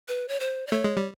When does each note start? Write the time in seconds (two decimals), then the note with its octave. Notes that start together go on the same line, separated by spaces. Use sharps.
0.08 B4
0.28 C#5
0.40 C5
0.67 D5
0.72 A3 C#5
0.84 G#3
0.97 G3